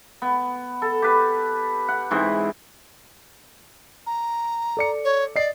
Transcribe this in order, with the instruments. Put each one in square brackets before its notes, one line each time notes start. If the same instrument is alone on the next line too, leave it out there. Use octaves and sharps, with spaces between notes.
[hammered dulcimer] B3
A4
G4 B4
F#5
G#2 E3 C4 G#4
[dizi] A#5
[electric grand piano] A4 D5 C#7
[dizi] C#5
[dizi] D5 [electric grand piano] D#5 C7